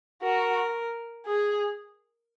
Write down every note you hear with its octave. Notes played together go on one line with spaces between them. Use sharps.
F#4 A#4
G#4